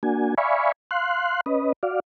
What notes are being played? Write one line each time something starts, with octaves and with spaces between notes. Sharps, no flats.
A#3 D4 F#4 G#5
D5 E5 F5 G#5 B5 C#6
F5 C6 F#6
C#4 B4 D#5
F#4 D5 F5